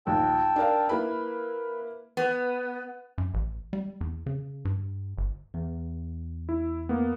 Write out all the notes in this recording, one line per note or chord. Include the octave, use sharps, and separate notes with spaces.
A#1 D#2 G5 A5 E6
D4 A#4 F5
A#3 E4 B4 B5
B3
F#2
A1
G3
E2
C#3
G2
G1
E2
E4
A#3 B3